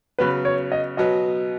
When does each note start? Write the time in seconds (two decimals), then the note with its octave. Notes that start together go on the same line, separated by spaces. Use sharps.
0.19 C#3 F#3 B3 B4
0.45 C#5
0.72 D#5
0.97 B2 F#3 B3 D#5